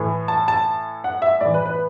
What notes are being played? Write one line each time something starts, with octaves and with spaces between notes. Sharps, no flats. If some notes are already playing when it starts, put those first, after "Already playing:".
Already playing: A2 E3
A5
A5
F#5
E5
A2 E3 D5
B4
B4